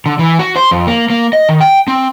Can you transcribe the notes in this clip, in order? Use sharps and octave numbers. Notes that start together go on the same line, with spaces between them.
D3
E3
F#4
C5
F2
A#3
A#3
D#5
D#3
G5
C4